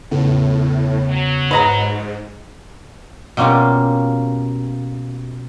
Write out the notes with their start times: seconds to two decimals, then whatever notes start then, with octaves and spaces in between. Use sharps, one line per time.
0.11 E2 A2 C#3 B3
1.09 F#3
1.51 G#2 B4 D#5 A#5
3.37 B2 A#3 C#4 F4 G4